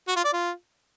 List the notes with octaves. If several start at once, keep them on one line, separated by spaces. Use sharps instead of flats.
F#4
F4
D5
F4